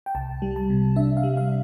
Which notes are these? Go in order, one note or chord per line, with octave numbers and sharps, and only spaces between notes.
G5
C2 A5
G3
A5
C3
D4 E5
F5
G3
F5